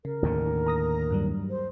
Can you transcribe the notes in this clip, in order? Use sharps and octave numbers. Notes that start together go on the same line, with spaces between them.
C#3 A#4
D#2 A2 D3
A#5 D#6 A#6
G2 F#3 G3
C5